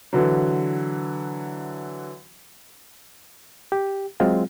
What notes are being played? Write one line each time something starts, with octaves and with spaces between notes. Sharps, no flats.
D3 E3 F#3
G4
F#3 G#3 C4 F4 G#4